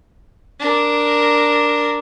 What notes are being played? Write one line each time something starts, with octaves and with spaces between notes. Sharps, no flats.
D4 A#4